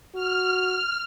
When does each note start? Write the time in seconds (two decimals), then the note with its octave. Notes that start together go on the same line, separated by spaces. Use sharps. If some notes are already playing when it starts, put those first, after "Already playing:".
0.15 F#4 F6